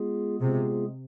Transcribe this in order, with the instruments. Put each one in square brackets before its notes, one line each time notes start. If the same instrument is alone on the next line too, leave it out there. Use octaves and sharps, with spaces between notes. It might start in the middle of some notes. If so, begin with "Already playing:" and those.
Already playing: [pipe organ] G#3 B3 F4 G#4
[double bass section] C3 [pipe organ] G#3 B3 F4 G#4